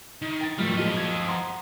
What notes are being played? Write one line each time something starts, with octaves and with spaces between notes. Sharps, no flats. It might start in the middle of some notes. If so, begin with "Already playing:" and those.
D#3
G5 A6
G#1 F3 G3 A3 F6
F#2 A#2 F3 G#3 D#5
G#6
F#5 A#5 C6